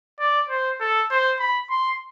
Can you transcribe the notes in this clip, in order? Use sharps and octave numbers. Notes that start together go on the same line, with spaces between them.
D5
C5
A4
C5
B5
C6